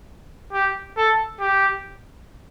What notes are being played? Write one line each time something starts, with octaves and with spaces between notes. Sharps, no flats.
G4
A4
G4